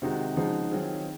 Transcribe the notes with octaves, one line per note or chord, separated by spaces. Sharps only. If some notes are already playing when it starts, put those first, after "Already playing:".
C3 D#3 G#3 D#4 F#4
C#3 F3 G#3 D#4 F#4
D#3 F#3 C4 F4 G#4